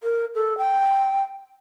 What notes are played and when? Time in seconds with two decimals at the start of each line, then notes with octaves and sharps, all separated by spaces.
0.03 A#4
0.35 A4
0.58 G5